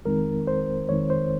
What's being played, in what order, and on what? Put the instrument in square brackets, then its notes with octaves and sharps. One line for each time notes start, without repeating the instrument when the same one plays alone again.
[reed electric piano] F2 D#3 G#3 C4 D#4 A#4
C5
F2 D#3 G#3 C4 D#4 C#5
C5